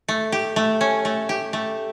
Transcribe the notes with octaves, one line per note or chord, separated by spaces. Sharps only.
A3
G4
A3
C#4
A3
G4
A3